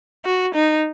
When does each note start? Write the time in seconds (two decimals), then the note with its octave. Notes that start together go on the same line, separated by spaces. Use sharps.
0.25 F#4
0.55 D#4